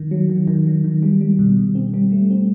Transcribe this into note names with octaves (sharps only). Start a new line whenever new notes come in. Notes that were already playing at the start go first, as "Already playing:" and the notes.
Already playing: D#3
F#3
D#3
D#3
F#3
D#3
G3
G3
B2
B2
C4
G3
A3
C4